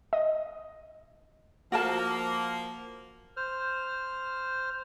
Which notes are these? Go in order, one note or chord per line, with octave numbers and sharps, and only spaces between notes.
D#5
F3 A#3 F#4 A#4 A5
C5 F6